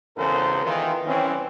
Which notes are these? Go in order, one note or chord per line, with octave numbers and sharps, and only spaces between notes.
G#1 E2 C#3 A4 A#4 C5
D#3 E3 F4
C2 E3 C4 C#4